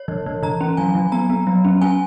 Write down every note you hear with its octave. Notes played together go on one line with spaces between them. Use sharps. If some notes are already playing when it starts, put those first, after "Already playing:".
Already playing: C#5
E3
E3
E3 A#5
C#4
F#3 G#5
F#3
B3 A#5
B3
F#3
C#4
C#4 G#5